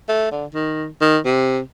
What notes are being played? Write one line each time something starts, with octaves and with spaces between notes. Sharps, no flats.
A3
D3
D#3
D#3
C3